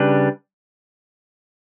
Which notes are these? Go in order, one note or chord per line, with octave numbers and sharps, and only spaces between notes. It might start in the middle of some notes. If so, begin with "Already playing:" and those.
Already playing: C#3 G3 D4 G4 B4